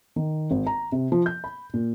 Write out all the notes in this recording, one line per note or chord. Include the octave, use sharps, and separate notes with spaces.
D#3
G#1
A#5
C3
F3
G6
B5
A#2